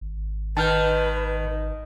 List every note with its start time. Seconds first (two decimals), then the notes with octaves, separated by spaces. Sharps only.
0.01 G#1
0.57 D#3 B4 A5 F6 G6